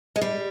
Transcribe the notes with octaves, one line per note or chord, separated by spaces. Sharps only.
G#3
G3